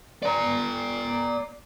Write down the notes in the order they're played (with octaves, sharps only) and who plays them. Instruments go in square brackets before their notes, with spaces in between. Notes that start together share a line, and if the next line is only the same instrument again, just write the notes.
[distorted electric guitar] D5 A#5